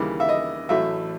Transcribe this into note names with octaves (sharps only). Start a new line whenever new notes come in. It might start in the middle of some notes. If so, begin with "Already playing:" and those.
Already playing: D#2 C#3 E3 G3
E5
D#5
A1 A2 F#3 A3 E5